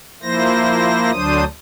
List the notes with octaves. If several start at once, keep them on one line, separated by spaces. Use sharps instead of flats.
F3 A#3 E4 C5 A#6
D2 F#3 D4 C5 D#6